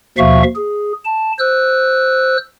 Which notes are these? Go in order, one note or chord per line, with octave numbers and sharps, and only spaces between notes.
D#2 B2 F3 E5 F5 C#6
G#4
A5
C5 E6 F#6